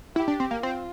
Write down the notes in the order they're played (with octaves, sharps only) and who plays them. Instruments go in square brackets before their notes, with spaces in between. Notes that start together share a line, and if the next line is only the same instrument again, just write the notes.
[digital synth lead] E4 [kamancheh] G4
[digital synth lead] D4
C4
A#3
[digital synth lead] C4 [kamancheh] F4